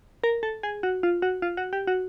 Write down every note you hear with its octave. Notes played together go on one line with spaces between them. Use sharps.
A#4
A4
G#4
F#4
F4
F#4
F4
F#4
G4
F#4